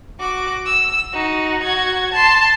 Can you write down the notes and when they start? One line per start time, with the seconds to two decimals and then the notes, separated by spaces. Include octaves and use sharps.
0.19 F#4 D6
0.65 E6
1.13 D#4 F#4
1.63 F#4 G#6
2.13 A5 C6